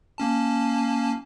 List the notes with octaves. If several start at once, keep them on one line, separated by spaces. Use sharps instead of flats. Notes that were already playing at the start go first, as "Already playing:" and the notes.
A#3 C#4 A5